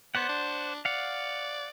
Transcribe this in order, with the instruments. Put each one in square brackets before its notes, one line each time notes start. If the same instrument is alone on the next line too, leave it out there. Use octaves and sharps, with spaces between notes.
[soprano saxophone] B3 [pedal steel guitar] C5 D5 F#5
[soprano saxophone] D4
[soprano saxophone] D5 [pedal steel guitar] F5 F#5